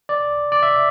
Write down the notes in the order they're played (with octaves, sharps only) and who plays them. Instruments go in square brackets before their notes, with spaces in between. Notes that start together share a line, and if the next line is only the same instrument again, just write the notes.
[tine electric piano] D5
D5
E5